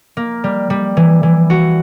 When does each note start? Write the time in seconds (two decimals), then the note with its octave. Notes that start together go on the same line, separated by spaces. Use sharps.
0.17 A#3
0.44 G3
0.70 G3
0.97 E3
1.23 E3
1.50 F#4